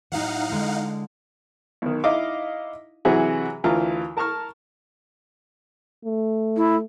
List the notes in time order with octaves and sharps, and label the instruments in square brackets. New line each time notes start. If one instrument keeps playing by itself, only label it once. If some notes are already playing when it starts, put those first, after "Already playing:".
[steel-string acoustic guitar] A2 F#3 [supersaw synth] D#4 F5 F#5
[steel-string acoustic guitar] D3 G#3
[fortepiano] B1 D#3
D#4 E4 D#5 F5 D6
C3 E3 F#3 E4 F#4 G#4
D2 E3 F4 A#4
A#4 A5 A#5 C#6 F6
[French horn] A3
[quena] E4